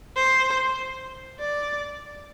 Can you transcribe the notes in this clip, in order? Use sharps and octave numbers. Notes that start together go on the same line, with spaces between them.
C5
D5